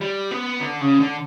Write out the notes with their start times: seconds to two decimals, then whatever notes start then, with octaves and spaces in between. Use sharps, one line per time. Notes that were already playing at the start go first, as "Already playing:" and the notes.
0.01 G3
0.31 B3
0.61 D3
0.81 C#3
1.00 D3